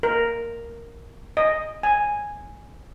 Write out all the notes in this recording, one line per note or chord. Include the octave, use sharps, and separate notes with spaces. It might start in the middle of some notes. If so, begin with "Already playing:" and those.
A#4
D#5
G#5